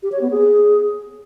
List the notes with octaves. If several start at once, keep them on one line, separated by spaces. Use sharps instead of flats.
G4
C#5
B3
G#4